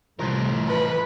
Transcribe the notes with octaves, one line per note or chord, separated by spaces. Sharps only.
C2 A2 E3 F3 A#4
F3 B4